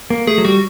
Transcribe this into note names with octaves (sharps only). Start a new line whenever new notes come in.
A#3
A3 G#4
F#3
G3 F#4